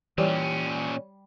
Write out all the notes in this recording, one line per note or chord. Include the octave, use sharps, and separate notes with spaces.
A#2 E3 G3 C#4 C#5 D5